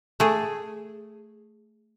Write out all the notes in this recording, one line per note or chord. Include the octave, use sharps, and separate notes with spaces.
A3 G#4